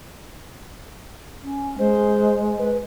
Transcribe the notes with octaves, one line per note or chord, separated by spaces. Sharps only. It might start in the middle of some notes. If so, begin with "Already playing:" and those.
C#4
G#3 C5
B4